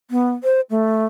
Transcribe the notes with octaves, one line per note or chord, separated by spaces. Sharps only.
B3
C5
A3